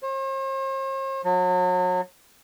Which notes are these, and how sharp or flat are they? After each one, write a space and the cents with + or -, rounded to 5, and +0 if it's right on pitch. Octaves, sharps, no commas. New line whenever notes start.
C5 +45
F#3 -35